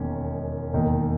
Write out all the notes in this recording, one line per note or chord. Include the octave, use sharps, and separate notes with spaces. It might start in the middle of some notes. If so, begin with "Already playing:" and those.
Already playing: E1 D#2 D#3 G#3 C#4
E1 D#2 D#3